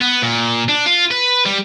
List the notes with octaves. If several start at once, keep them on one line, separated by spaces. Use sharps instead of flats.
B3
A#2
D4
F4
B4
G3